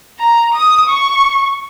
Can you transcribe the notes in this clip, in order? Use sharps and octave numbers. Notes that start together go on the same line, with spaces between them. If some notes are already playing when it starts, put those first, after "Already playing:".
A#5
D#6
C#6